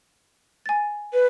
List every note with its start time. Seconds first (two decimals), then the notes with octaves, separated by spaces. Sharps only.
0.66 G#5 A6
1.13 B4